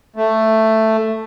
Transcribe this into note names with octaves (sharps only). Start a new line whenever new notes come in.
A3